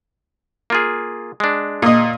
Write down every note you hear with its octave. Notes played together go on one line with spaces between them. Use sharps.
A#3 F4 G#4
G#3 D4
A#2 D#5